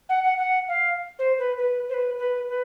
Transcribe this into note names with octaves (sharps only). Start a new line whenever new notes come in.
F#5
F#5
F#5
F5
C5
B4
B4
C5
B4
B4
B4